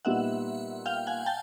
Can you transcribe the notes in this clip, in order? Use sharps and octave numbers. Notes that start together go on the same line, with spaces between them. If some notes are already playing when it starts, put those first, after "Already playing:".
A#2 G3 B3 D#4 E5 F#5
F5 G5
F#5 G#5
G5 A5